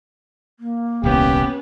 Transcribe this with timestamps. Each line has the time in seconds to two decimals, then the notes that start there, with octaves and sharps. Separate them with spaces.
0.60 A#3
1.04 D#1 C2 B3 C#4 G4